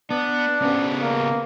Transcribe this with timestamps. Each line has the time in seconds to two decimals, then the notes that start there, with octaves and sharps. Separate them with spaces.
0.10 B3 D4
0.62 C#3 B3
1.01 A#3